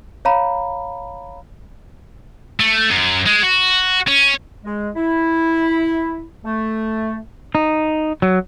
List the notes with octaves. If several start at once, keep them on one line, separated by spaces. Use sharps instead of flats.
C#5 F5 A#5 B5
A3
F#2
G#3
F#4
C#4
G#3
E4
A3
D#4
F#3